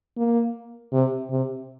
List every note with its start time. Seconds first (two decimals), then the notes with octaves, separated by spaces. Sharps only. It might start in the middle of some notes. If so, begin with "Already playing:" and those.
0.17 A#3
0.93 C3
1.31 C3